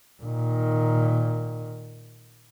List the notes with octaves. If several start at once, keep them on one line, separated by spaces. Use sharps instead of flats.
A#2 D#3